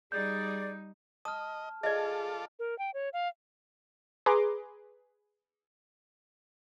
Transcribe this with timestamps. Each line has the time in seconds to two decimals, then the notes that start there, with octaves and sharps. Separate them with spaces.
0.12 G3 D#4 G#4 D5 G6
1.25 D#5 A5 D#6 F6
1.83 F4 G#4 A4 D5 D#5 D6
2.59 A#4
2.78 G5
2.94 C#5
3.13 F5
4.26 G#4 B4 A#5 C6 D6